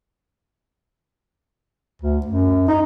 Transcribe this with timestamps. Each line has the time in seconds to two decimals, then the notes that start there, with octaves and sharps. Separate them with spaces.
2.02 D2
2.26 F#2
2.68 D#4